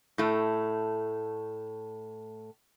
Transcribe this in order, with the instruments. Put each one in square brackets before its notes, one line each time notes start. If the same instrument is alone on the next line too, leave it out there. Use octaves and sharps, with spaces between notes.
[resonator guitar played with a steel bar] A2 A3